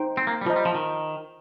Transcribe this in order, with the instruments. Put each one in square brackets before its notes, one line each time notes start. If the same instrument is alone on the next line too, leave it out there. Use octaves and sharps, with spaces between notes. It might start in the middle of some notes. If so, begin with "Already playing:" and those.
Already playing: [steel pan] D#4 C5 G5
[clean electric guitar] C4
A#3
G3
[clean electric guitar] F3 [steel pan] F4 C5 D#5 A#5
[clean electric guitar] G3
F3
D#3